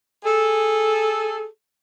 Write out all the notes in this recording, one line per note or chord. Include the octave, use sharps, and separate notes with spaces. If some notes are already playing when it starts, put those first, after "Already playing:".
G#4 A4